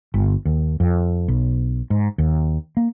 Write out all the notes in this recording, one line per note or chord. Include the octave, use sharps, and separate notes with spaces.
G1
D#2
F2
B1
G#2
D#2
A#3